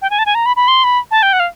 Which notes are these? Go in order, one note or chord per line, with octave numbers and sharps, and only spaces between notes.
G5
G#5
A5
G#5
A#5
B5
B5
C6
B5
A5
G5
F#5
F5